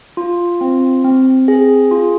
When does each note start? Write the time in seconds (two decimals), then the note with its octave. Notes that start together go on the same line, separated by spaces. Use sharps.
0.17 F4
0.61 C4
1.04 C4
1.48 G#4
1.91 F4